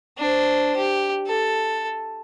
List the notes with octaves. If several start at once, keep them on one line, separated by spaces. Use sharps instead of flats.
D4 C5
G4
A4